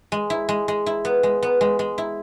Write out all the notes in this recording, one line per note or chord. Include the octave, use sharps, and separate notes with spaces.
G#3
E4
G#3
G#3
E4
B3
G#3
B3
G#3
G#3
E4